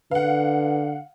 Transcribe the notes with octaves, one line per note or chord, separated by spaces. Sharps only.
D3 B4 F5 F#5